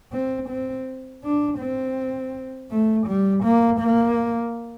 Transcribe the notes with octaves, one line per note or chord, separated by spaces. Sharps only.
C4
C4
D4
C4
A3
G3
A#3
A#3